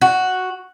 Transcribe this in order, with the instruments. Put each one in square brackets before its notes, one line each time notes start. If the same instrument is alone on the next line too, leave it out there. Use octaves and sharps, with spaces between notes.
[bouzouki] F#4